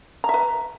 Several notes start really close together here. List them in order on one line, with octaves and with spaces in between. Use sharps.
A#5 E5 B4